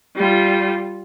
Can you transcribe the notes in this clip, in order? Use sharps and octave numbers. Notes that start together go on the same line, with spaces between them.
G3 F4